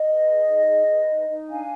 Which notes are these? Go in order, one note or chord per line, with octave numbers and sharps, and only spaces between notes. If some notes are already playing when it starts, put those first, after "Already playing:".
Already playing: D#5
B4
G#4
D#4
G#4
B4
D#4
D#4
D4 F5 G#5